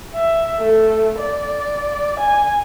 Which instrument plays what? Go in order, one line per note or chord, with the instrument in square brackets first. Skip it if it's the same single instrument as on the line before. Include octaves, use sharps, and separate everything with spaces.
[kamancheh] E5
A3
D5
G#5